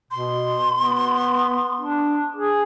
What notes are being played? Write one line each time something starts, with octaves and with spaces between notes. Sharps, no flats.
B2 C6
B3
D4
G#4